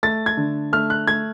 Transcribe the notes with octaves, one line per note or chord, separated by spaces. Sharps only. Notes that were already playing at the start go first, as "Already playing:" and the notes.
A3 A6
G#6
D3
A3 F6
F#6
A3 G#6